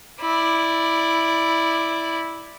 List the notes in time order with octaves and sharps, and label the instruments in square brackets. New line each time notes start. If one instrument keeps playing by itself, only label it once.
[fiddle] E4 D5